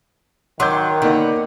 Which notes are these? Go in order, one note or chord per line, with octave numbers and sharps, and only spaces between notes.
D#3 F#3 C6 D6 G6
D3 A#3 B3 D#4